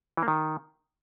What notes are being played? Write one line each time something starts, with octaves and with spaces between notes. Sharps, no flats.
E3
A#3
D#3